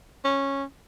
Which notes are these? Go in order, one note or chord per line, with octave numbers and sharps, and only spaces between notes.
C#4